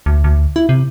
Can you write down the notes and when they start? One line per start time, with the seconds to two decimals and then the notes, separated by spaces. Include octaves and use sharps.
0.06 D2
0.24 D2
0.56 E4
0.69 C3